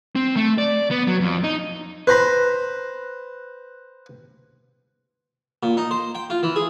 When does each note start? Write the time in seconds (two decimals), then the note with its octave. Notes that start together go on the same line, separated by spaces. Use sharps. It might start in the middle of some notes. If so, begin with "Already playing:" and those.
0.16 C4
0.36 A3
0.58 D5
0.91 B3
1.08 F#3
1.20 F2
1.44 D#4
2.07 B4 C5 A#5 B5
5.63 A#2
5.77 D#4
5.91 C5
6.15 G5
6.30 F4
6.43 E3
6.56 G#4